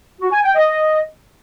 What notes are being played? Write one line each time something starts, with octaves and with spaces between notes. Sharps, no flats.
F#4
G#5
G5
D#5